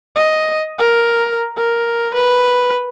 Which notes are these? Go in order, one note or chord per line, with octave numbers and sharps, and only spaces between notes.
D#5
A#4
A#4
B4